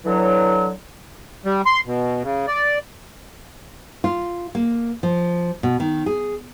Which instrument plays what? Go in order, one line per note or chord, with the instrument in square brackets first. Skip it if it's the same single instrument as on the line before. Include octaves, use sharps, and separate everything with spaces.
[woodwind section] D3 E3 F#3
[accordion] G3
C6
B2
C#3
D5
[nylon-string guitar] F4
A#3
F3
B2
D#3
G#4